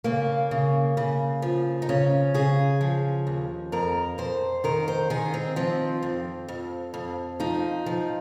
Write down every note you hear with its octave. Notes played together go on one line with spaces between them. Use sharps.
C#3 A#3
C#3
C#3
F3
D#4
C#3 C#4
C#3 G#4
F3
D#2
F2 A#4
F2 C5
D#3 A#4
C5
D#3 G#4
C4
F3 C4
F2
F2
F2
F3 D#4
F3